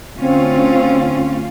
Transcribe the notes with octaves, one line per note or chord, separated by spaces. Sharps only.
D2 C4 C#4 F4